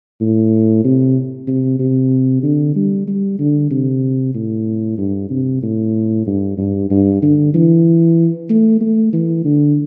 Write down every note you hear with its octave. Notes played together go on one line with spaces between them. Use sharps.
A2
C3
C3
C3
D3
G3
G3
D3
C3
A2
G2
C3
A2
G2
G2
G2
D3
E3
A3
A3
E3
D3